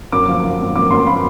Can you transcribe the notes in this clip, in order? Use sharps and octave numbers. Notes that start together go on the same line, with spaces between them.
F#2 D6
F3
F3
G#1
F#2 D6
F#2 C6
F3 B5